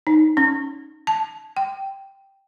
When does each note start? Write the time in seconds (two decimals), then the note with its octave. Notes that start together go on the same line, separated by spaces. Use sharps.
0.07 D#4
0.37 C#4
1.07 A5
1.57 G5